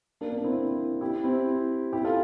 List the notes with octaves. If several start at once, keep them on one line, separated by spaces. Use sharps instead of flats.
A#3 D4
A#3 D4
C4 E4
E4 G4
C4 E4
E4 G4
F4 A4